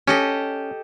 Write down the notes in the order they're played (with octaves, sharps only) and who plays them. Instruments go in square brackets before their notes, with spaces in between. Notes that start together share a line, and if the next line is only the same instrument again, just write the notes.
[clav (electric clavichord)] C#4 [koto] G4 A4 D#5